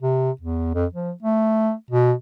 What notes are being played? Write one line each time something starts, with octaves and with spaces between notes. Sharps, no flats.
C3
E2
F2
F3
A3
B2